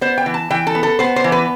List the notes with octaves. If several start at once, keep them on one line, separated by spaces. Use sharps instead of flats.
B3 C5
G5
E3
A5
E3 G5
A4
B3
A4
B3 C5
C5
E3
B4